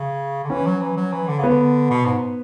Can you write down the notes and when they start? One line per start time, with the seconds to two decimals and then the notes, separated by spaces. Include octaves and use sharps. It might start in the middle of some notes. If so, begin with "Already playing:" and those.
Already playing: C#3
0.44 D3
0.50 E3 C#4
0.66 F#3
0.81 E3
0.97 F#3
1.12 E3
1.28 D3
1.38 C#3
1.43 B3
1.49 D3
1.90 B2
2.06 G#2